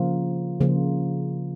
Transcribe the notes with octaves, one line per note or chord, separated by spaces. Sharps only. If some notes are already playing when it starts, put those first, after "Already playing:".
Already playing: C#3 F3 A#3 F4
C#3 F3 A#3 F4